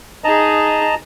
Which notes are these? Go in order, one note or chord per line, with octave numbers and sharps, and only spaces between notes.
D#4 G#4 D#5 A5 A#5